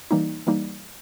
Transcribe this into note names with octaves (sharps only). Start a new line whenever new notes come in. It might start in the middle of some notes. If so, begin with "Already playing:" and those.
E3 G3 A#3 D#4
E3 G3 A#3 D#4